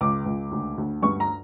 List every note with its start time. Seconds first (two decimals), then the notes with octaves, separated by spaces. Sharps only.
0.01 C#2 D6
0.26 C#2
0.51 D2
0.77 D2
1.02 G2 C#6
1.20 A#5